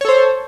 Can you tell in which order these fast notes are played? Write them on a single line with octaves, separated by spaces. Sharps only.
C#5 A4 C5